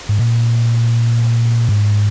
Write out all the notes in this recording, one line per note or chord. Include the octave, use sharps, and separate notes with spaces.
G#2
A#2
G#2